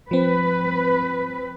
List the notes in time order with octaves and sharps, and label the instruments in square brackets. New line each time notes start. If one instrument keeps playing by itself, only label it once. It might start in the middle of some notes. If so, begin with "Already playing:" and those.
[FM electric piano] F3 C4 [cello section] B4